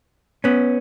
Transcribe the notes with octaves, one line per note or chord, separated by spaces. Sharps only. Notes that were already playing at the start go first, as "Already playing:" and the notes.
B3 C#4